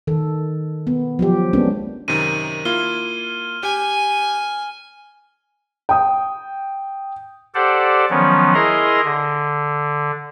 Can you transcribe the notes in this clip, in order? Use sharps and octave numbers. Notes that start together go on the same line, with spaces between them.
D#3 A4
B3
F3 F#3 G4
G#3 A#3 B3 C#4 D4
F#2 C3 D#3 D#7
A#3 E4 F4 F6 G7
G4 G#5
G5 D#6
G4 A4 C5 D5 F#5
D#3 F3 F#3 B3 C#4
E4 G#4 A#4 D#5 A#5 C6
D3